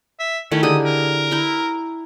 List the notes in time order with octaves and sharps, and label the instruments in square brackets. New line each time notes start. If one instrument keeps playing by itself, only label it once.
[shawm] E5
[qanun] D#3 A3 E4 [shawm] C#4
[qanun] D3 G4 G#4 [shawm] D#6
[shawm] A#4
[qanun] E4 G5 A#5